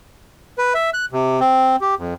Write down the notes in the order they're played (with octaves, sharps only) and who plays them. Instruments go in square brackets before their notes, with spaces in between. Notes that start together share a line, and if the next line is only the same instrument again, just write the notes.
[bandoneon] B4
E5
F#6
C3
C4
G4
F2